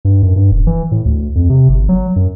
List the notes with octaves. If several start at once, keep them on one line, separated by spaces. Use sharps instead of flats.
G2
F#2
G2
D#1
E3
A2
D2
F2
C3
G1
F#3
F#2